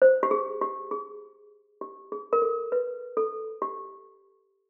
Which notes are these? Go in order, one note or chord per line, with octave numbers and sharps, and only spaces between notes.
C5
G4
G#4
G4
G#4
G4
G#4
A#4
A4
B4
A4
G4